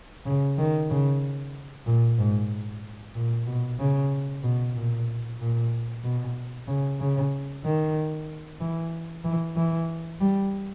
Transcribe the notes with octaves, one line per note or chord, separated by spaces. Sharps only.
C#3
D#3
C#3
A#2
G#2
A#2
B2
C#3
B2
A#2
A#2
B2
C#3
C#3
D#3
E3
E3
E3
G3